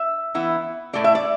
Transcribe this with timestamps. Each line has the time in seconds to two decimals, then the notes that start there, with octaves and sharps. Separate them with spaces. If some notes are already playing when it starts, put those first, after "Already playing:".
Already playing: E5
0.35 E3 B3 E4
0.93 A2 A3 E4 D5
1.04 E5
1.15 D5